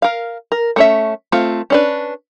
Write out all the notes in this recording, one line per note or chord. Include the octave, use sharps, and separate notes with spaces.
A#4 F5
A#4
A3 C#4 E5
A3 C4 F4
C#4 D4 B4